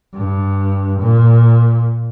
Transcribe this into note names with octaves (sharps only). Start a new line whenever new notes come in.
G2
A#2